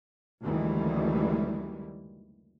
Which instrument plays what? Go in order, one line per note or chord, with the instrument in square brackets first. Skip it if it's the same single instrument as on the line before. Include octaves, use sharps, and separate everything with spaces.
[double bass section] F#1 D2 D#3 E3 G3 G#3